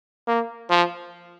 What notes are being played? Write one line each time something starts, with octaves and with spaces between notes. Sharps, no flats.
A#3
F3